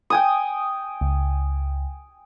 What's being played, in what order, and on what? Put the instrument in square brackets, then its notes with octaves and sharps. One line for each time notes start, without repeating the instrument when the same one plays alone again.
[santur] G5 G#5 D#6
[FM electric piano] C#2